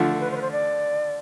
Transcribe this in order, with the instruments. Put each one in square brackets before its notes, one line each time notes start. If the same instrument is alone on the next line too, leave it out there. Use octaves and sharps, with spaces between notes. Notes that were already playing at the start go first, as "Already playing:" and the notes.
Already playing: [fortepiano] D3 F3 A3
[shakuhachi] A4
B4
C5
B4
C5
D5